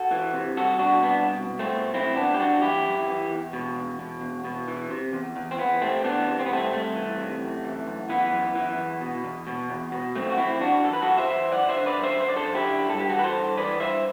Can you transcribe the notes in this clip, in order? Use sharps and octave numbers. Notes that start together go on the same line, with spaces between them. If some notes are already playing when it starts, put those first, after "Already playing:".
Already playing: F#4 A4
E3
C3
C2 F#4 A4
B2 D4 F#4
C2 B3 D4
B2
C2
A3 C4
B2
F#2 C4 E4
E3 B3 D4
G4
F#2 D4 F#4
E3 E4 G4
F#2
E3
E2
B2
E2
B2
E2
B2
E3
C3
E2
E2
C4
E3 B3
C3 A3 C4
E3 B3 D4
C3
C4
B3
C2 A3 C4
C2 A3
E3
C3
F#2
E3
F#2
E3 B3
F#2
E3
E2
B2
E2
B2
E2
B2
F#2 A3 C4
F#4
E3 C4 E4
F#2 D4 F#4
E3 A4
B4
F#2 F#4 A4
C5 E5
E3
F#2 D5 F#5
C5 E5
D3
B4 D5
F#2
C5 E5
D3 C5
D5
A4 C5
F#2
E4 G4
D3
G2 A4
G4
E3 F#4 A4
B4
A4 C5
G2
E3 B4 D5
G2 C5 E5